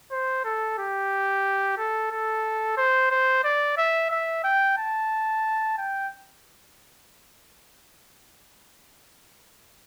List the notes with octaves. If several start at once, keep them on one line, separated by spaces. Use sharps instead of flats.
C5
A4
G4
A4
A4
C5
C5
D5
E5
E5
G5
A5
G5